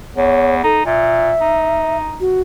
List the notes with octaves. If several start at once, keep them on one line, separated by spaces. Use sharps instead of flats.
E2 C#5
D#4 A4
A#2 E5
D#4
F#4